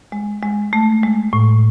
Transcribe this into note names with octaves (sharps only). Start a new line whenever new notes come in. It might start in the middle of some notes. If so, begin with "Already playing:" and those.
G#3
G#3
A3
G#3
A2